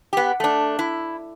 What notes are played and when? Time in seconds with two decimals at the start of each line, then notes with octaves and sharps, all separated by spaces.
0.13 B3 G4
0.40 A3 D4
0.79 E4